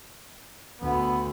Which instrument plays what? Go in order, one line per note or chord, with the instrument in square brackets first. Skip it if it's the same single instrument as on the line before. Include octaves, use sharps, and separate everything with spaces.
[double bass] D2 [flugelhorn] B3